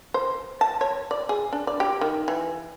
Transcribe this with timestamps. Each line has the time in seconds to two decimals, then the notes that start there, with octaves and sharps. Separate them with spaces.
0.14 C5
0.61 A5
0.81 C#5
1.11 D5
1.29 G#4
1.53 D4
1.67 D5
1.80 G4
2.01 D#3
2.28 E3